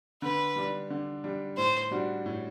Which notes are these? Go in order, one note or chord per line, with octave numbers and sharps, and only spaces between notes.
D3 B4
G3 D4
D3
G3 D4
A2 C5
G3 D4 F#4
A2